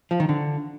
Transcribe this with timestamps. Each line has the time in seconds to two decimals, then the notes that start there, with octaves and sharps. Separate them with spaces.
0.11 F3
0.20 D#3
0.29 D3